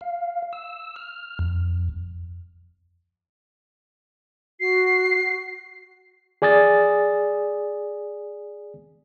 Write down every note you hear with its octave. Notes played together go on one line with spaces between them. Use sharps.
F5
E6
F6
F2
F#4 C7
G#4 D5 G#5 D#6 A6